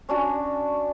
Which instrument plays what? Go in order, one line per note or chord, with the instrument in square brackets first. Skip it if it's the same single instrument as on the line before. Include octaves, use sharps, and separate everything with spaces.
[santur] C#4 D4 F#4